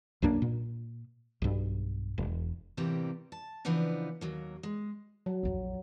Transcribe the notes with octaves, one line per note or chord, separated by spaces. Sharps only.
B1 F#2 A#3 D4
A#2
B1 G2
E1
A2 C3 E3 G3 A#3 G4
A5
C#3 E3 F3 B3 D4 D#4
D#2 F#3 A#3
G#3
F#3
A#1 F2